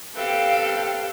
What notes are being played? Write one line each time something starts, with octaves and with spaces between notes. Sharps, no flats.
C4 G4 A4 B4 F5 G5